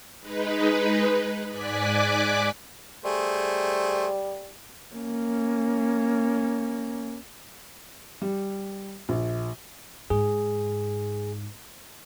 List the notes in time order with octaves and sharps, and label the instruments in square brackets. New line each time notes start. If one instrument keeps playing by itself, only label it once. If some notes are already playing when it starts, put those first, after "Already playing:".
[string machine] G#3 D#4 B4
G#2 D5 G#5 D6 F#6 B6
[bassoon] G3 [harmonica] A3 G#4 C5
[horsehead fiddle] A#3 C#4
[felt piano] G3
A#1
[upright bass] G#2 [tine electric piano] G#4